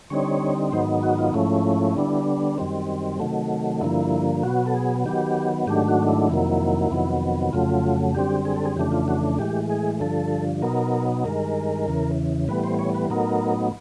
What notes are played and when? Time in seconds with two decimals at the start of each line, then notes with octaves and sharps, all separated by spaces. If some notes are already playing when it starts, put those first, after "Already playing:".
0.10 D3 G3 C4 D#4 C#5
0.72 G#2 D#3 F#3 B3 D#4 C5
1.03 F#4
1.18 F4
1.34 G#2 F3 A3 C#4 E4
1.96 D3 G3 B3 D4
2.58 F#2 D#3 G3 C4
3.20 C3 D#3 F#3 A3
3.81 G2 D3 F3 A#3 E4
4.43 B2 F#3 B3 F#4
4.66 A4
4.74 G#4
5.06 D#3 F#3 B3 G4
5.67 G#2 D#3 F#3 A3 D4 G4
5.88 F#4
6.09 E4
6.29 F2 C3 D#3 F#3 A#3
6.91 F2 C3 D#3 F#3 B3
7.53 F2 C#3 F#3 A3 F4
8.14 F#2 D3 G3 C4 G4
8.45 G#4
8.56 A4
8.65 G#4
8.77 F2 C#3 E3 A3 D4 G4
8.92 F4
9.08 F#4
9.38 A2 E3 G#3 G4
9.70 G#4
10.00 G2 D3 F3 A4
10.62 B2 F#3 B3 D#4 A#4
11.24 G2 D#3 G#3 A#4
11.86 E2 C#3 E3
12.48 A2 E3 G3 B3 B4
12.64 C5
12.79 C#5
12.95 B4
13.10 A2 F#3 B3 D#4 A#4